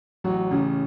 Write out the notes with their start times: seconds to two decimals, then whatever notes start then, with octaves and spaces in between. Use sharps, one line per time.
0.24 A1 F#3 F#4
0.51 A1 C#3 C#4